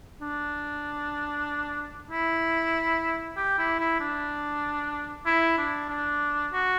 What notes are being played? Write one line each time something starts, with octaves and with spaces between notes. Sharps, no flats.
D4
E4
G4
E4
E4
D4
E4
D4
D4
F#4